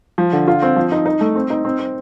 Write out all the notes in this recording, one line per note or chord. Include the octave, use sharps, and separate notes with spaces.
F3
D3
F4
C4
F3
D#4
D#4
A3
C4
D#4
C4
C4